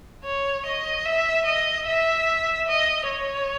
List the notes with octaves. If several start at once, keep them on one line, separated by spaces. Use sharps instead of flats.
C#5
D#5
E5
D#5
E5
D#5
C#5